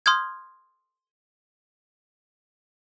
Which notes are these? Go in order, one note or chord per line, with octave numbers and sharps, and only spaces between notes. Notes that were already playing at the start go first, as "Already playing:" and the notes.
C6 D#6 F6 G6 G#6